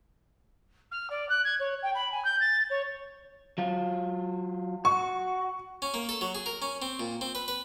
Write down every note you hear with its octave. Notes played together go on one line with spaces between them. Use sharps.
F6
D5
F#6
G#6
C#5
G5
B5
G#5
G6
A6
C#5
F#3 F4
F#4 C#6
C#4
A#3
A4
F#3
G#4
A#4
C#4
C4
A#2
C4
B4
B4